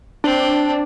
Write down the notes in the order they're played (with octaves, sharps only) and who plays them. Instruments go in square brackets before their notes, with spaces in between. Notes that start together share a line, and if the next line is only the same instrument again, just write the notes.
[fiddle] C4 [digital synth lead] D4